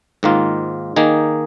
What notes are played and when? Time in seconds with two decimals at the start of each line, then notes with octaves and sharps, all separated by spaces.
0.23 G#2 D#3 A#3 F4
0.96 D#3 A#3 D#4 G#4